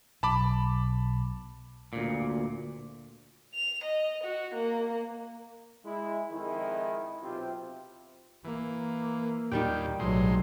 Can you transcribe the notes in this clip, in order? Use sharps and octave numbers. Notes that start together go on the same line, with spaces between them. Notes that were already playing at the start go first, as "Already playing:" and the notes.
B1 A5 B5 D6
D2 A#2
F7
D#5
F#4
A#3
G#3 E4
F2 D#3 G#3 E4
B1 C3 C4 F4 G4
E3 A#3
D#2 A#2 D#3 G3 G4 G5
B1 A2 F#3 G#3 C6